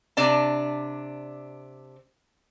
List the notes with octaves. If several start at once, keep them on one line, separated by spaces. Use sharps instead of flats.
C3 D4 D5 A5